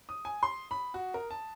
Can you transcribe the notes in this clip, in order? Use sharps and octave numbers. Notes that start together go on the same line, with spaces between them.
D#6
G#5
C6
B5
F#4
A#4
A5